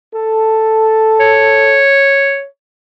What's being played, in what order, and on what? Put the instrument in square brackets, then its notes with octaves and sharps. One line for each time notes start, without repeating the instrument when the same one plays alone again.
[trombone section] A4
[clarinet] C#5